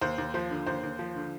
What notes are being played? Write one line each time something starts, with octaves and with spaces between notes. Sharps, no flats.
D#2 C5
D#2
F3 C5
D3
D#2 C5
D#2
F3
D3